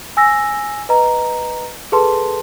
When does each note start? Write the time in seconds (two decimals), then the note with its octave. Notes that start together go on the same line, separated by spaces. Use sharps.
0.17 G#5 E6 A#6
0.89 B4 D#5 A#5
1.92 G#4 A4 B4 A5 C6